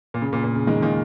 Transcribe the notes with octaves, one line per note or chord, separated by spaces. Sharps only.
A#2
C#3
A#2
A#2
C#3
D#3 G#3
A#2 D#3